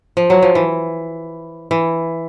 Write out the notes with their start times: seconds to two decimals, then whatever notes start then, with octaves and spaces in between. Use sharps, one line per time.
0.17 F3
0.30 F#3
0.42 F3
0.55 E3
1.71 E3